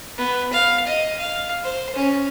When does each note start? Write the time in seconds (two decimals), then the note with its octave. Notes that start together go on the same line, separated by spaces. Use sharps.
0.18 B3
0.53 F5
0.87 D#5
1.19 F5
1.64 C5
1.96 C#4